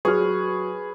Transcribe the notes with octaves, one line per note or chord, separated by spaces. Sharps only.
F#3 F#4 G#4 B4 C#5 F6